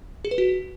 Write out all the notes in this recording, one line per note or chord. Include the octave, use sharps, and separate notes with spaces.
G#4
B4
F#4